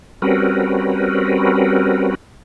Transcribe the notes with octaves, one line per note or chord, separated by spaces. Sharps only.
G3 C4 C#4 F#4 A#4 B4